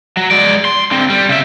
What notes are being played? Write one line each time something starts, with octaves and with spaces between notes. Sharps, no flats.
F#3
G#3 D5
C6
D3 C4
G3
C#3 E5